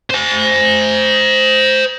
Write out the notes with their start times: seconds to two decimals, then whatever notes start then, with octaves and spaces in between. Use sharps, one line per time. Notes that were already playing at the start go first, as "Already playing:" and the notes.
0.10 C5 G#5